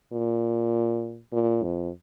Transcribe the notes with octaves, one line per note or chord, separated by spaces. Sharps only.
A#2
A#2
F2